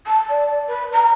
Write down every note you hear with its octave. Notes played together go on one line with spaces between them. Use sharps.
A5
D5
B4
A#5